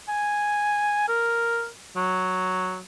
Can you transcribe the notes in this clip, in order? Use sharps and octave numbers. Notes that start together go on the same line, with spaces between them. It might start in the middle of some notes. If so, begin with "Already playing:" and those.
G#5
A#4
F#3